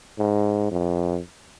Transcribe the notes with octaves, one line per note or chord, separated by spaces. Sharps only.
G#2
F2